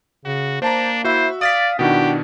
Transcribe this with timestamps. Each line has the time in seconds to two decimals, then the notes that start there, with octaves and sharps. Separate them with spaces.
0.25 C#3 F#4
0.62 A#3 D4 C5 A5 A#5
1.04 E4 F#4 C5 E5
1.41 D5 F5 D#6 A6 B6
1.79 B2 D#3 D4 E4 F#4 G4